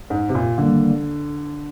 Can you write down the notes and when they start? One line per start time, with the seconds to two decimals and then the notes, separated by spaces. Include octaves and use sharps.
0.10 G#2
0.29 C3
0.35 A#2
0.58 D3 D#3 G3 A#3